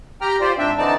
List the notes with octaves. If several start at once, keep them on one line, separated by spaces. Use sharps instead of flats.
G4 G5 A#5 F6
F4 G4 C5 D5
G#2 C4 D4 E5 G5
D3 E3 C4 D#4 D5 A5